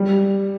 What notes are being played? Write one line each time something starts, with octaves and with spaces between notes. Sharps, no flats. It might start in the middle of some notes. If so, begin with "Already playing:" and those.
Already playing: G3